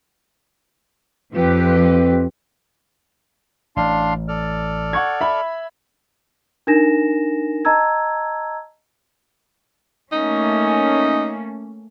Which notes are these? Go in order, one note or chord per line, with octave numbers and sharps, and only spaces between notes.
F2 F3 C4 G4 B4
A1 D4 F5 C6
A4 D5 F6
F#5 C#6 G#6
E5 B5
D4 D#4 A#4 G#5 A#6 E7
D#5 A5 A#5 E6 G#6
A3 A#3 C#4 D#4